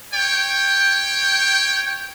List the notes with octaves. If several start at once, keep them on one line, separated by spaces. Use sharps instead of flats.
C#5 G5